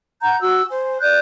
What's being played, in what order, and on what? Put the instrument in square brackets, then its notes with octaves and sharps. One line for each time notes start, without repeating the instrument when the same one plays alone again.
[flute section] F#5 A#5 G6
F#4 E6
C5 G#5
D5 F#6 G6